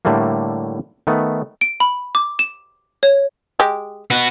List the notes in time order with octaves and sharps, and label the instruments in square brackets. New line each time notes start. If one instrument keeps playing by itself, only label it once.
[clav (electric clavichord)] A2 D3 G3 A3 A#3
D#3 A3 B3
[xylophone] D7
B5
D6
E7
C#5
[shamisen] G#3 G4
[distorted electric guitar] B3 F#4